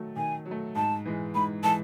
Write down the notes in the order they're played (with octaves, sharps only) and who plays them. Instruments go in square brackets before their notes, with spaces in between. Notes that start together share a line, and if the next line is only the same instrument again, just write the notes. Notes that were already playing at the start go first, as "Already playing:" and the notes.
Already playing: [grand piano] D#3 F#3 A3
[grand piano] D#3 [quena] G#5
[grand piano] F#3
A3
[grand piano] G#2 [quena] A5
[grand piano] E3 G#3
[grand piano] G#2 [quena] B5
[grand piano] E3 G#3 [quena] A5